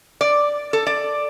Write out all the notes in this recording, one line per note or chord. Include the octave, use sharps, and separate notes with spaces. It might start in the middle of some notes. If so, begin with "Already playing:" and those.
D5
A4
D5